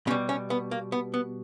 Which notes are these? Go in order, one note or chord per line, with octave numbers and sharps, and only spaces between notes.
B2 G3 C#4
C#4
B3
A#3
B3
B3